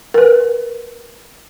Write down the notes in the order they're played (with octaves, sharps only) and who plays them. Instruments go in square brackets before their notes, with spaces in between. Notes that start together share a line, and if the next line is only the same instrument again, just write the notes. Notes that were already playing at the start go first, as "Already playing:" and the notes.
[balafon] A#4 B4